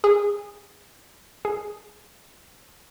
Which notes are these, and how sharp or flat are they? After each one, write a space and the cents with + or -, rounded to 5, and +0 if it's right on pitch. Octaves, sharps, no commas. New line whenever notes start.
G#4 -20
G#4 +5